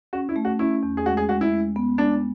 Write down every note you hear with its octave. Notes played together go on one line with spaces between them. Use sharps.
C#4 F#4
E4
A3
F#4
C#4 E4
E2
G#4
G#3 F#4
G#4
G#3 F#4
E4
G#3
B3
G#3 D4